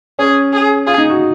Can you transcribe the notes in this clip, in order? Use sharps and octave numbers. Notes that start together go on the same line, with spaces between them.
C#4 G#4
G#4
F4 G#4
D#4
F#4